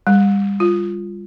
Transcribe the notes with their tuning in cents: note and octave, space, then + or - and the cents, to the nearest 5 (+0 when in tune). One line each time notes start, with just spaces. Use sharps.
G3 +30
F4 -5